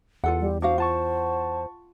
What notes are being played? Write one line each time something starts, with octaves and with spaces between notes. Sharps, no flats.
E2 F4 A4 F#5
G3
D4 F#4 C5 F5
F4 F#5 A5 C#6